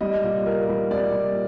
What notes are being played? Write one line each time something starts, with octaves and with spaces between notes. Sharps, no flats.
G3 D#5
A#2
A#2 A#4
G3
G3 D5
A#2